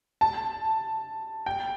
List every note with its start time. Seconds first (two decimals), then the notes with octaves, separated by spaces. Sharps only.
0.21 A5
1.46 G5